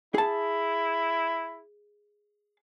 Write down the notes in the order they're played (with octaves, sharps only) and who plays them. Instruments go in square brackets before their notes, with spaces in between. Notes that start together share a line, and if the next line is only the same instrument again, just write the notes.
[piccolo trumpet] E4 [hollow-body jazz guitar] G#4 A5